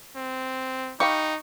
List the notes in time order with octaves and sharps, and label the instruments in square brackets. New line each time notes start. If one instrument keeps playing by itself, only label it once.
[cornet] C4
[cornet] D#4 [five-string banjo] G4 F5 B5 [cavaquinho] C#6